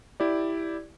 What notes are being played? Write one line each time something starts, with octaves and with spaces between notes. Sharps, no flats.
E4 G4 D5